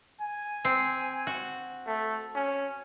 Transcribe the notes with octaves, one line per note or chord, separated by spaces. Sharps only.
G#5
C4
F#4
A3
C#4